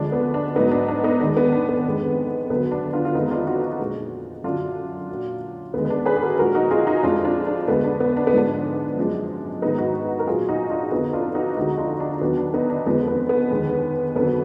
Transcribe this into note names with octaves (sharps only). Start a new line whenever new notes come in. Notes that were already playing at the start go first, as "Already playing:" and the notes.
Already playing: D2 D3 F3 G#3 D4
B3
D4
G#2 F#3 B3 D#4
D4
D4
B3 D#4
D#2 D#3 G#3 D4
B3
D4
B3
F2 D#3 G#3
D2 D3 F#3 B3
D4
D4 F4
F4
F2 D#3 G#3 B3 D#4
D4 F4
D#4 F#4
A#2 G#3
F#2 D3 F#3 D4 F4
A#2 F#3
D#2 D3 G#3 B3
B3
D4
G#4 B4
G#4
F#4 A#4
A#2 F3 G#3 F#4 A#4
D#4 F#4
F4 G#4
D#4 F#4
F2 F3 G#3 D4 F4
D4 F4
D4
D2 D3 G#3 B3
D4
B3
D4
B3
G#2 F3 G#3 D4
F#2 F3 G#3
G#2 D#3 G#3 B3 D#4
D#4 F#4
A#4
A#2 F#3 F4 G#4
D#4 F#4
D4 F4
F2 D3 F3 B3 D#4
D4 F4
D#4 F#4
D2 D3 F3 G#3 D#4 F#4
D4 F4
D4
D#2 D3 F#3 B3
D4
B3 D#4
D4
F2 D3 F3 G#3 B3
B3
B3
D#2 D3 G#3
F2 D3 F#3 B3